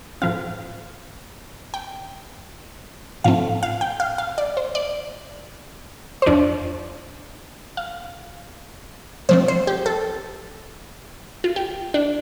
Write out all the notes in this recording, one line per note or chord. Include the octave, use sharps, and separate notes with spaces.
A2 F3 C4 F5
G5
A2 F3 A3 C4 F5
F5
G5
F5
F5
D5
C5
D5
C5
F2 F3 D4 D5
F5
C3 F3 C4 C5
C5
G4
A4
F4
G4
D4